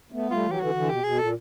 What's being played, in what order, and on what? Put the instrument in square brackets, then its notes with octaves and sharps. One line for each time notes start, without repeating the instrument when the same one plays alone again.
[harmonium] A3 B3
[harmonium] G3 A3 [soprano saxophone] F4
[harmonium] E3 F#3
[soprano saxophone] G4
[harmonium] D3 E3 [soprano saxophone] F#4
[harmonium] D3 E3
[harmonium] B2 [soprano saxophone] G4
[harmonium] B2 [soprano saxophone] G#4
[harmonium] A#2 [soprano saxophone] A4